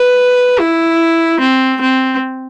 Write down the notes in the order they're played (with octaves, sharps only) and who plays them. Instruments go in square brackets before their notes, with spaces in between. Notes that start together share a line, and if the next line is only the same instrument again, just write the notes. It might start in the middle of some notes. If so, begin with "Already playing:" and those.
Already playing: [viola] B4
E4
C4
C4